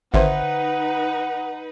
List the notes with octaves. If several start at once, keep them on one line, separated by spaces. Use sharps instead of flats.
G#1 D3 D#4 B4 C5 E5 F#5